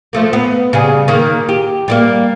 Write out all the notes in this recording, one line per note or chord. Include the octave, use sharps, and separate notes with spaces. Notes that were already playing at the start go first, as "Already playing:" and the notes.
F3 A3 A#3
B3
C#3 G3 G#4
D#3 A#3
G4
G3 G#3 A#3